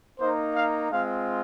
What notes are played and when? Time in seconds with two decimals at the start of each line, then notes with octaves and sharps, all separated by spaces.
0.19 A#3 D#4 C5
0.55 F5
0.91 G#3 C4 F4 F5